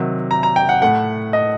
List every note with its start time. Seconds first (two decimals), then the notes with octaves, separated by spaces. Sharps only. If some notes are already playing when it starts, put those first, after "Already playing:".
Already playing: C3 D#3 F#3
0.31 A#5
0.43 A#5
0.56 G5
0.69 F#5
0.82 A2 A3 F#5
1.33 D#5